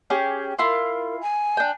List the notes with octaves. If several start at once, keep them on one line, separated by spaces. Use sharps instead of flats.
C#4 G4 G#4
E4 F4 A#4 C6
G#5
D4 G5